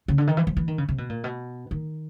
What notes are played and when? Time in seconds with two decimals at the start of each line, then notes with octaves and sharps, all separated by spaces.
0.08 C#3
0.18 D3
0.27 D#3
0.37 E3
0.47 F3
0.57 E3
0.68 D#3
0.78 C#3
0.89 C3
0.98 B2
1.09 A#2
1.24 B2
1.71 D#3